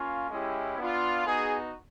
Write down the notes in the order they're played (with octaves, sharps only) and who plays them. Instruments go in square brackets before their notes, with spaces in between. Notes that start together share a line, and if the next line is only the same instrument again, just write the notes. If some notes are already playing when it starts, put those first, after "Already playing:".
Already playing: [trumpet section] A#3 C#4 F4
G#3 C#4 E4 G4
B3 D4 F4
B3 D#4 F#4 G#4